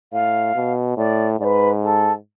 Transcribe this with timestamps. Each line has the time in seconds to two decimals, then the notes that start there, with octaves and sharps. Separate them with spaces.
0.13 A2 F5
0.55 B2
0.97 A2 D5
1.40 G#2 D5
1.44 B4
1.82 A4